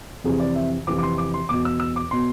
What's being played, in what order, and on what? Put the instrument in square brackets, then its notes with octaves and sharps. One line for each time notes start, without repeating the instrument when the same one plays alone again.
[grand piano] F2 C3 E3 G#4
D5
E5
F2 C3 E3 D6
D6
C6
D6
C6
E2 B2 D6
E6
E6
D6
B2 C6